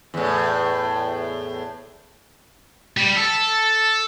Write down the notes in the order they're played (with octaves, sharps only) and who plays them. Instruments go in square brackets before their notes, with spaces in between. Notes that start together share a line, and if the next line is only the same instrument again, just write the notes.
[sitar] E2 A2
[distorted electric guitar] G3
A4